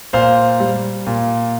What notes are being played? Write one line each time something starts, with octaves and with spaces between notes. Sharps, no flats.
A#2 C5 F5
G3
A#2